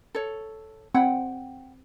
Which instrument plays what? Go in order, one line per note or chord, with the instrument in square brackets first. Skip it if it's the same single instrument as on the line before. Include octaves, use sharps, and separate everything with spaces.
[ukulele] A4 C#5
[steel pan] C4 [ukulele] F#5 G5